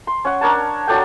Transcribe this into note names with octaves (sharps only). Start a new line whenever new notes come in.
C6
C#4 F#5
D4 A#4 C#5 A5
F#3 D4 A4 G5